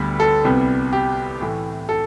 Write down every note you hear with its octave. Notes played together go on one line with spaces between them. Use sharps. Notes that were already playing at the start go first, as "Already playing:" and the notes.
Already playing: D2 D3 G3 B3
A4
C2 C3 G3 B3
G4
A2 E3 A3
A4